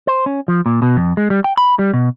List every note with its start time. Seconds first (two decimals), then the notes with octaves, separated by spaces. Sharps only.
0.07 C5
0.26 C#4
0.48 F3
0.66 A#2
0.82 B2
0.97 F2
1.17 G#3
1.30 G3
1.44 G5
1.57 B5
1.79 G3
1.93 B2